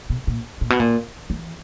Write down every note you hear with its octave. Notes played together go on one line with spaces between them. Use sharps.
B2
A#2
A#2
B2
A#2
E3